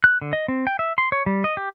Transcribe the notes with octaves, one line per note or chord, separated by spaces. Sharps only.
F#6
D3
D#5
C4
G5
E5
C6
C#5
G3
D#5
G4